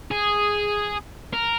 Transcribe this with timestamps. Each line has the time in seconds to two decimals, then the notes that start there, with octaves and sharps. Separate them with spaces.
0.11 G#4
1.33 A#4